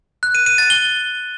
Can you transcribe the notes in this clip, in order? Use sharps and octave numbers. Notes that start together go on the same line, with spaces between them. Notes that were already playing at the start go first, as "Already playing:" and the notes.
F#6
D#7
D#7
A6
G7